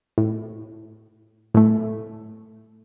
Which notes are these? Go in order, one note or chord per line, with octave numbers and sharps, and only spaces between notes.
A2
A2 A3